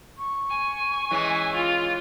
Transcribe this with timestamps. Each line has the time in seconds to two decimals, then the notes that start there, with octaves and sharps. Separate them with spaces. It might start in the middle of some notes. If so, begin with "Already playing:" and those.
0.18 C#6
0.50 G#5
1.11 E3 G#3 C#4
1.54 F4